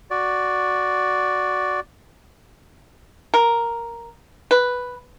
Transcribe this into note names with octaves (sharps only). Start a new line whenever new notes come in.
F#4 D5
A#4
B4